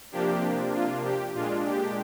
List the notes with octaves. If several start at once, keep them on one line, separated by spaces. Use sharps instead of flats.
C3 F3 A#3 D4 G4
F4
G4
A#2 G#3 D4 F4
G4